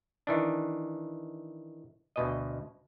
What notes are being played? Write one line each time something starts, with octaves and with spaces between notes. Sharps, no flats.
D#3 E3 D4
D2 B2 D#5